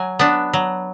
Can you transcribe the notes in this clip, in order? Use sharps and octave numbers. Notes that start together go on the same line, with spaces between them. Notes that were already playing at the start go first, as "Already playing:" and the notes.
Already playing: F#3 G#5
B3 D4
F#3